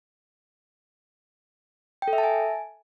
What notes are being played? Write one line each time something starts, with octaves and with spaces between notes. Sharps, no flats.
G5
A4
E5
A5
G#5